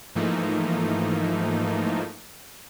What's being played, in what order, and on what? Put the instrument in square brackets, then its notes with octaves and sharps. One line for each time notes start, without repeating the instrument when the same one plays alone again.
[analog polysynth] G#2 E3 F3 A3 A#3 D#4